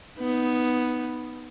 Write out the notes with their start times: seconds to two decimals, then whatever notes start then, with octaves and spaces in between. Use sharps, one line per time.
0.18 B3 D#4